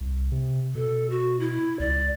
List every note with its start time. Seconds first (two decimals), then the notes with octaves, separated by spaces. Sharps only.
0.01 C2
0.32 C3
0.75 B2 A4
1.10 F#4
1.40 E4
1.80 C#2 D5